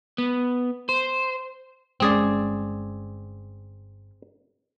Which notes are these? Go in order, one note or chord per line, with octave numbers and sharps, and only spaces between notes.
B3
C5
G1 G#3 C4 C#4 G#4 D5